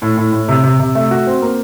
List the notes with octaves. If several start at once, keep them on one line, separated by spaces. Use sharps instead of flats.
A2
A2
A2
C3
C3
C3
A3
F#4
C4
A#3